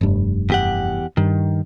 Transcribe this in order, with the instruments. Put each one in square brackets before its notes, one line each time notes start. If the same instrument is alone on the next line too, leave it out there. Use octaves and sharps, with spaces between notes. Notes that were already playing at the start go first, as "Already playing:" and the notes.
[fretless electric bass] F1 G2
[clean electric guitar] E2 G4 F#5
[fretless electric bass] G2 [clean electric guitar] D#3